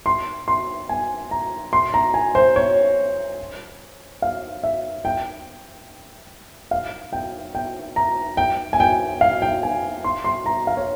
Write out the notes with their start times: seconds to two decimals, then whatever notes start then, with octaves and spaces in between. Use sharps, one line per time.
0.06 C6
0.48 C6
0.89 G#5
1.31 A#5
1.73 C6
1.94 A#5
2.14 G#5
2.35 C5
2.56 C#5
4.22 F5
4.63 E5
5.05 G5
6.71 F5
7.13 G5
7.55 G5
7.96 A#5
8.37 G5
8.73 G#5
8.80 G5
9.21 F5
9.42 G5
9.63 G#5
10.04 C6
10.24 C6
10.46 A#5
10.67 F5
10.77 C#5